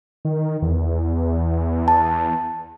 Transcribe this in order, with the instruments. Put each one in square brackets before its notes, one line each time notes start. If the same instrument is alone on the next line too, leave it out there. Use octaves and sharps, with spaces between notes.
[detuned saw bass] D#3
E2
[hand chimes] A5